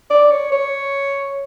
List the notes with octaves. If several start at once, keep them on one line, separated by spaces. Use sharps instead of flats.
D5
C#5
C#5